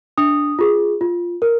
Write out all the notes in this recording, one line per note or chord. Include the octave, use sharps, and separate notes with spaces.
D4 D#6
F4 G#4
F4
A#4